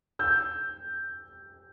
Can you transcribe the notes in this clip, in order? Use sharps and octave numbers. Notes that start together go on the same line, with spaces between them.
E6 G6